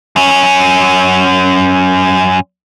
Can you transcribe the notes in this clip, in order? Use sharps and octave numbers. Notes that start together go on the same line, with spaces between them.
F#2 C#4